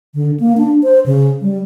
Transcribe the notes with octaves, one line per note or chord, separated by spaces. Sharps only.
D3
A#3
D4
C5
C#3
G3